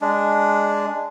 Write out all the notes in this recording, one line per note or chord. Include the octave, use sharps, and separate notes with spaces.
G#3 D4